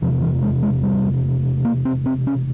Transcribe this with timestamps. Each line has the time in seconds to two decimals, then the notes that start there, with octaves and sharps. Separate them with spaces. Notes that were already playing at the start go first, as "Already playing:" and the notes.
0.01 E1 E2 C3 F3
0.22 E3
0.42 G#3
0.63 G#3
0.83 G3
1.65 A#3
1.85 C4
2.06 C4
2.27 C#4